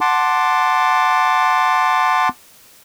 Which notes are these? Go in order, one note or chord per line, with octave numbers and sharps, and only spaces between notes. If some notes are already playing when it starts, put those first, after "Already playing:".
F#5 A5 C6 D6